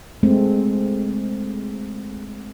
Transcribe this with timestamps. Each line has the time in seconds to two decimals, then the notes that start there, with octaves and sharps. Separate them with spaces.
0.23 G#3 A3 C4